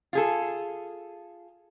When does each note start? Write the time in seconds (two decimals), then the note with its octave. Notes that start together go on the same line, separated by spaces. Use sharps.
0.13 F4 G#4 A4